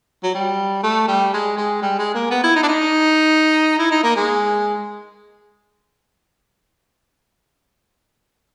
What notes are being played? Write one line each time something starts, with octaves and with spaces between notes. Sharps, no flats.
F#3
G3
A3
G3
G#3
G#3
G3
G#3
A#3
B3
E4
D#4
D4
D#4
E4
D#4
A#3
G#3